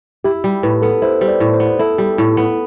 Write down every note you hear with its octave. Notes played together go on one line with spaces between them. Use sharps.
E4 G4
G3
A2 B4
B3 A4
E4 C5
G3 C5
D5
A2
C5
B3
E4 A4
G3
A2
B3